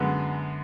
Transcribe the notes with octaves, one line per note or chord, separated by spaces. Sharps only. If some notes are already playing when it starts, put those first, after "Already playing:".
Already playing: F#2 D3 G#3 B3